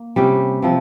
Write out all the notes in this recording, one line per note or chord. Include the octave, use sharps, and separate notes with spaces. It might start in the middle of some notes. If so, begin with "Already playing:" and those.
Already playing: A#3
C3 G3 C#4 G4
C3 F3 C4